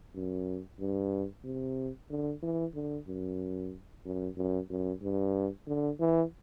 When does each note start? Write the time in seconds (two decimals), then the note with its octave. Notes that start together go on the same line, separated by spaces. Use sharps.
0.15 F#2
0.80 G2
1.44 C3
2.10 D3
2.43 E3
2.75 D3
3.08 F#2
4.05 F#2
4.37 F#2
4.70 F#2
5.02 G2
5.67 D3
6.00 E3